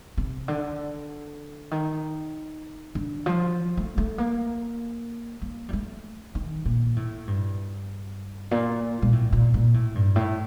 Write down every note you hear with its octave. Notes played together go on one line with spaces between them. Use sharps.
C3
D3
D#3
D3
F3
A3
A3
A#3
A#3
G3
A3
D#3
A#2
A2
G2
A#2
A#2
A2
A#2
A#2
A2
G2
A2